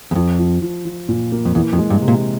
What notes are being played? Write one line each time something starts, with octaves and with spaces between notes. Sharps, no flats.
E2
F2 F3
F3
F3
F3
A#2
A#3
F2
E2 E3
F2
G#3
G2
C3
A#2